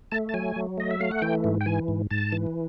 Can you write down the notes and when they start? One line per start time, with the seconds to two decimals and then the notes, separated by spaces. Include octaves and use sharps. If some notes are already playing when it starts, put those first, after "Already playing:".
0.12 A3 A5
0.29 A5
0.34 F#3 G#5
0.56 F#3
0.78 A3 D#5
0.91 E5
1.00 A3 F5
1.11 F#5
1.22 E3 G5
1.44 G#2
1.61 G5
1.66 E3 G#5
1.88 G#2
2.11 G#2 A5
2.32 E3